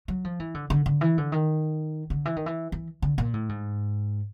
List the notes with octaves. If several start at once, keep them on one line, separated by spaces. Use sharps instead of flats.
F#3
F3
E3
D3
D3
D3
E3
D3
D#3
D3
E3
D#3
E3
E3
D3
A#2
A2
G#2